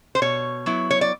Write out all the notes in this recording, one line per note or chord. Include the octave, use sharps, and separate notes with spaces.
C5
B2 C#5
F#3 B3 E4
C#5
D5